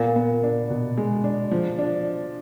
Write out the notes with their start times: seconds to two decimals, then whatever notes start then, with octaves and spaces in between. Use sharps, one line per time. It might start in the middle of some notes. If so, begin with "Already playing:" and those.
Already playing: A#2 B3
0.16 B3
0.43 D4
0.70 B2
0.98 G#3
1.24 D4
1.51 F3
1.79 D4